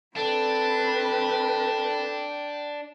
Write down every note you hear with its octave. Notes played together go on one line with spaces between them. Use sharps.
C4 D4 A4 B4 G5